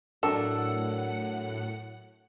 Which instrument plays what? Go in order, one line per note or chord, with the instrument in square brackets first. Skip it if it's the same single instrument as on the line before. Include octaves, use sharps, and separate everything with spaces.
[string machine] A2 F#5 C#7 [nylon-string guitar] F#3 D4 A#4 [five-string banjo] A4